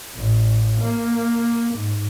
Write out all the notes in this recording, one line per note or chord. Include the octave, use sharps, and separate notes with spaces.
A1
A#3
G#2